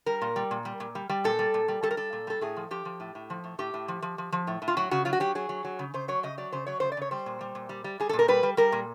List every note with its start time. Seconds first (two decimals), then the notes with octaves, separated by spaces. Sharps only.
0.06 G3 A#4
0.22 A#2
0.36 G3
0.51 A#2
0.65 G3
0.80 A#2
0.95 G3
1.09 G3
1.24 A#2 A4
1.39 G3
1.54 A#2
1.68 G3
1.83 G3 A4
1.91 A#4
1.97 G3 A4
2.13 A#2
2.27 G3 A4
2.41 A2 G#4
2.57 F3
2.71 F3 G4
2.85 F3
3.00 A2
3.15 A2
3.30 F3
3.44 A2
3.59 A2 G4
3.74 A2
3.88 F3
4.02 F3
4.18 F3
4.32 F3
4.47 A2
4.62 A2
4.68 F4
4.77 F#3 F#4
4.91 C#3 F#4
5.05 F#3 F4
5.13 F#4
5.20 F#3 G4
5.35 F#3 G#4
5.49 F#3
5.65 F#3
5.79 C#3
5.94 C#3 C5
6.08 F#3 C#5
6.23 C#3 D#5
6.38 F#3 D5
6.52 C#3 C5
6.66 F#3 C#5
6.80 C#3 C5
6.92 D5
6.97 C#3 C#5
7.11 G3 C5
7.26 A#2
7.41 G3
7.55 A#2
7.69 G3
7.84 G3
8.00 G3 G#4
8.09 A4
8.13 A#2
8.19 A#4
8.28 G3 B4
8.43 G3
8.57 G3 A#4
8.72 A#2